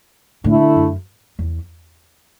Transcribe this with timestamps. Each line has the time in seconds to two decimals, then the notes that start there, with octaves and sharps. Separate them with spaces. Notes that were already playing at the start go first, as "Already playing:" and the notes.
0.44 A2 D3 A3 E4
0.76 F#2
1.39 E2